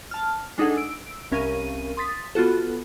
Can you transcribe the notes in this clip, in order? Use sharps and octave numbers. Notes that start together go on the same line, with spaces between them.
A5 F6
G#3 D4 D#4 G#4 A4 F#5
E6 D7
C2 C#4 A#4 F5 D#7
C6 D#6 A6 B6
B3 F4 F#4 A4